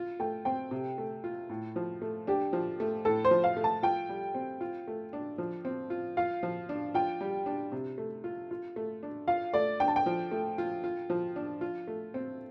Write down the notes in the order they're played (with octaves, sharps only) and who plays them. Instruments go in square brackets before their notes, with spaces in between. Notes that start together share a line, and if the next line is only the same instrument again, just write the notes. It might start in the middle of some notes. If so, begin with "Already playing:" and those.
Already playing: [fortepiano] F4
[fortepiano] A3 [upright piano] G5
[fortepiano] C4 [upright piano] G5
[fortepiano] C3
A3
F4
A2
F3
A3
[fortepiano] D4 [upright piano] G4
[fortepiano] F3
A3
[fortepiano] A2 [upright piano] A4
[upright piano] C5
[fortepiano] F3
[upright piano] F5
[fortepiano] A3
[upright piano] A5
[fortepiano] F4 [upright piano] G5
[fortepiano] G3
C4
F4
A3
D4
F3
C4
F4
[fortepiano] F4 [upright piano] F5
[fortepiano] F3
D4
[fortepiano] F4 [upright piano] G5
[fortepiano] G3
D4
C3
A3
F4
F4
A3
D4
[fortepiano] F4 [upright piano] F5
[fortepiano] A3 [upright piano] D5
[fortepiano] D4 [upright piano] G5
[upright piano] A5
G5
[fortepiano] F3
A3
F4
F4
F3
D4
F4
A3
C4